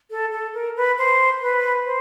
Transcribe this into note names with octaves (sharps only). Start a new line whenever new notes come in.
A4
A4
A#4
B4
C5
B4
C5